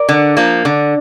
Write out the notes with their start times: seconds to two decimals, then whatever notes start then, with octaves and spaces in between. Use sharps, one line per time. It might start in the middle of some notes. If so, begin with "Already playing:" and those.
Already playing: A#4 D5
0.09 D3
0.37 F3 A#3
0.65 D3